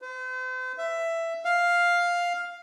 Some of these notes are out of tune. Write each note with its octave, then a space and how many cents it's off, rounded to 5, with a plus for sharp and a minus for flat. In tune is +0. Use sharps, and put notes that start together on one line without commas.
C5 -40
E5 +10
F5 +5